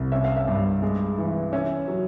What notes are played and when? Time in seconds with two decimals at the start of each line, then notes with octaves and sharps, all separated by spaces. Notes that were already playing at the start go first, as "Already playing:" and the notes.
Already playing: C2
0.12 C#4 E5
0.24 F5
0.36 E5
0.47 G2
0.82 G#3
1.18 E3
1.53 C#4 E5
1.88 F#3